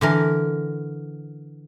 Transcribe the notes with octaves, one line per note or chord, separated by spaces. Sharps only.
D3 E3 A#4